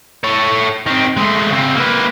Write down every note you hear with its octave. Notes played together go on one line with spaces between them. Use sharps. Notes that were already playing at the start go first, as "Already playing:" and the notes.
A4 C#5
D#3 C4
G#3 A3
C#3 C4
A#3 B4